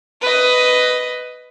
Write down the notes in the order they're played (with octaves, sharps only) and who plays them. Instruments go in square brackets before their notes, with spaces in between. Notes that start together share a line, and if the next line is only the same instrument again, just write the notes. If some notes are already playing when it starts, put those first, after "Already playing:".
[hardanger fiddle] B4 D#5